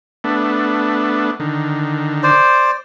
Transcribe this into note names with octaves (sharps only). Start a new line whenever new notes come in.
A3 B3 D4
D3 D#3
C5 D5